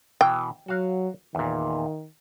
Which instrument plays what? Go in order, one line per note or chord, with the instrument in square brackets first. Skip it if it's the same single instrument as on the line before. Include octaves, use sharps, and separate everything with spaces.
[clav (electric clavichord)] B2 E3 [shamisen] G5
[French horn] F#3 [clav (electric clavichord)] F#4 F5
[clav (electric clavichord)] E2 A#2 [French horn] D#3